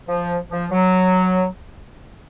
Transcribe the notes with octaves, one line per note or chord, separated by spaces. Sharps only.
F3
F3
F#3